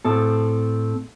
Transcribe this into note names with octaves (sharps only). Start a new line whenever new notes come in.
A2 C4 A4